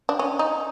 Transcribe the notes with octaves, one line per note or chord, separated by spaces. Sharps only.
D4
C#4
D#4